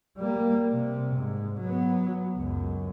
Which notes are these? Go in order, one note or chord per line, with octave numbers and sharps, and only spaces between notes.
G3 A#3
C3
G#2
F#3 B3
C#2 F#2